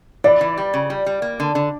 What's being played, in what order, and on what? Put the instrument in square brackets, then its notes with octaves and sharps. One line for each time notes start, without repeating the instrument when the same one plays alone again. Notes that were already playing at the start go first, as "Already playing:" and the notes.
[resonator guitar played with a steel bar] E3 [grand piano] D5
[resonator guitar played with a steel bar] E3
G3
C#3
G3
G3
A#3
D3
D3